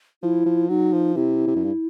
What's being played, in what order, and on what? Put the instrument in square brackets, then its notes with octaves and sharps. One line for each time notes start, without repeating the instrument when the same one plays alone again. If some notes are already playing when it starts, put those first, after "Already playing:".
[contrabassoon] F3 [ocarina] E4
[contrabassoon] F3
[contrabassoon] F#3 [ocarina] D#4
[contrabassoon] F3
[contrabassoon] C3 [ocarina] E4
[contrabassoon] C3
F#2
G2